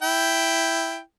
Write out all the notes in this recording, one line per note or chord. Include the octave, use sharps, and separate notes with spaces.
E4 G5